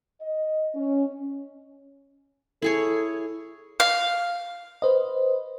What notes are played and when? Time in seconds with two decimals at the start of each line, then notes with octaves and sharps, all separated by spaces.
0.21 D#5
0.75 C#4
2.62 E4 G#4 A4 C#5
3.80 F5
4.82 B4 C5 D#5